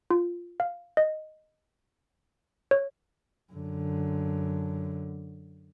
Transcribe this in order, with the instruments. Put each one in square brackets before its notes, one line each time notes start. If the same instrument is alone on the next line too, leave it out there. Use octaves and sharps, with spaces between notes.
[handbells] F4
F5
D#5
C#5
[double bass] F#2 D3